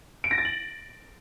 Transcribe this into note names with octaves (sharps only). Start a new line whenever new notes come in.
D7
A#6
A6
F#7